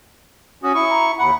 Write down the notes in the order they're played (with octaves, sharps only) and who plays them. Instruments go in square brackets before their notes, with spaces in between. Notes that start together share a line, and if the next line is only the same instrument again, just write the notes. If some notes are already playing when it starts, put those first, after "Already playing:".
[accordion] C#4 F#4 [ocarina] D#6
[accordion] E4 C#6
[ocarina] A#5
[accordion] D#2 F#5 [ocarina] B5